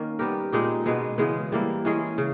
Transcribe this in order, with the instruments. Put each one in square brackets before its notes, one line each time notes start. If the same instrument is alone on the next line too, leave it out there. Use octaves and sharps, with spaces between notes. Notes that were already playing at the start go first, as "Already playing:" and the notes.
Already playing: [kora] D#3 A#3 C#4 D#4
G3 B3 G4 A#4
A#2 G#3 D#4 G4
B2 G#3 B3
C#3 E3 G#3 B3
E3 G3 A#3 E4
E3 G#3 C#4 G#4
C#3